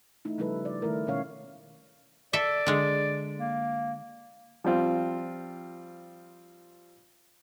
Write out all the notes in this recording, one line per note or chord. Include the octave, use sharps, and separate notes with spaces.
A3 D#4 E4
C#3 F3 G3 E4 A4 B4
D5
D#3 A3 E4 A#4
B2 D#3 G#3 C#4 C#5 F5
A4 D5 E5
D3 G#3
A#3
F3 G3 C4 F4